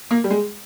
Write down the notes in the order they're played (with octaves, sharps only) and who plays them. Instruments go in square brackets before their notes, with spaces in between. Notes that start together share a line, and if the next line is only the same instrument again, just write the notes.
[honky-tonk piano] A#3
G3
G#3